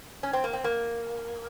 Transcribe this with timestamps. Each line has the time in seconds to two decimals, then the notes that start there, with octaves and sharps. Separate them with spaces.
0.23 C#4
0.33 C4
0.44 A#3
0.53 C4
0.64 A#3